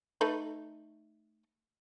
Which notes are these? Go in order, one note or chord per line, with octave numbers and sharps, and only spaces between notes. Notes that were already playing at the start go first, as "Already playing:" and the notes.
A3 D#4 B4